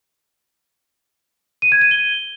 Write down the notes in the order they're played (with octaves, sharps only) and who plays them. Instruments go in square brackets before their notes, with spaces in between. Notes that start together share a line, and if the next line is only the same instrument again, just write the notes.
[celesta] D#7
G#6
D#7
G7